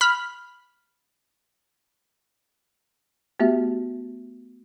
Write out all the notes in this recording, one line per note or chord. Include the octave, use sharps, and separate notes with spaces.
B5 F6
A3 B3 F#4 G4 E5